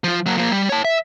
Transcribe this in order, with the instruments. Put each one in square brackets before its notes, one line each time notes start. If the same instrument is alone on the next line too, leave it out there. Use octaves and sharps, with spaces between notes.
[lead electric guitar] F3 F4
F#3 A#3
F3 A#3
G3
C#5 A5
E5